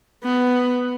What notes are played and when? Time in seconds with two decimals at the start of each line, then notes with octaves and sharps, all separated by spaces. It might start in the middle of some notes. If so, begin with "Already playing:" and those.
0.24 B3